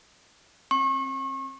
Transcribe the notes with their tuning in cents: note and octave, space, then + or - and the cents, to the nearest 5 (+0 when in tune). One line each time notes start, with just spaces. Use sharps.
C4 +25 C#6 -35